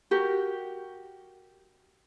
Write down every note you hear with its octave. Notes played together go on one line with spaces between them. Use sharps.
F#4 G4 A#4